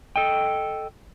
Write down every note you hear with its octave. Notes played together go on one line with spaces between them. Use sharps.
A4 D#5 G5